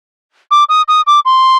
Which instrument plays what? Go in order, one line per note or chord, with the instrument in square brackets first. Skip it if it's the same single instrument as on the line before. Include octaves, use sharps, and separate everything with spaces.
[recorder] D6
D#6
D#6
D6
C6